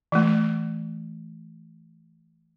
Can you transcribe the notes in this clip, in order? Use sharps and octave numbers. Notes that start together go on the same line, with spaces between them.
E3 A3